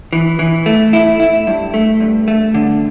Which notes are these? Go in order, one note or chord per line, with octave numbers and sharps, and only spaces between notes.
E3
E3
A3
E4
E4
G2
A3
G2
A3
D3